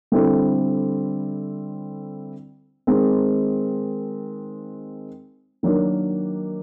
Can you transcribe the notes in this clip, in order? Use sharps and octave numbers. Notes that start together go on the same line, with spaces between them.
D3 G3 C4 E4 A4
D#3 G#3 C4
D#3 F#3 A#3 D4